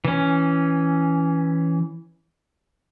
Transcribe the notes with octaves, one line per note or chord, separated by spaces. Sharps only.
E3 C#4